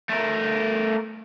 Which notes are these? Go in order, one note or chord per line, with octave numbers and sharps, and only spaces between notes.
A3 A#4